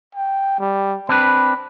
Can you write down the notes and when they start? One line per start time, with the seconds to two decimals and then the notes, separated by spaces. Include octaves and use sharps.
0.15 G5
0.59 G3
1.09 C4 D4 B4 B5